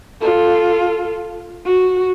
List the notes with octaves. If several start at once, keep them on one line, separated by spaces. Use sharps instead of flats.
F4 A4
F#4